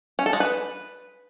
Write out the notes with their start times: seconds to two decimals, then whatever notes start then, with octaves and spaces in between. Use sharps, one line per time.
0.19 C#4
0.26 A4
0.33 G#3
0.40 B4